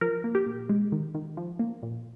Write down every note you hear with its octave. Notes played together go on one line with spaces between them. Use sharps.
F3 A#4
A#3
G4
A#2
G#3
D#3
D#3
F3
A#3
A#2